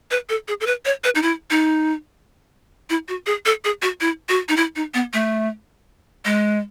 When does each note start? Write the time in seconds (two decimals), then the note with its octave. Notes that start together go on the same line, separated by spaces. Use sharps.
0.11 B4
0.29 A4
0.48 G#4
0.61 A4
0.67 B4
0.85 C#5
1.04 B4
1.15 D#4
1.22 E4
1.50 D#4
2.90 E4
3.08 F#4
3.26 G#4
3.46 A4
3.64 G#4
3.82 F#4
4.01 E4
4.29 F#4
4.49 D#4
4.56 E4
4.76 D#4
4.94 B3
5.13 A3
6.25 G#3